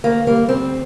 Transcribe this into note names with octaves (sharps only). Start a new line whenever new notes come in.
D2 A#3
G3 A#3
D2 C4